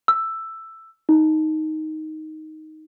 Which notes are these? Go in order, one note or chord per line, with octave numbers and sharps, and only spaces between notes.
E6
D#4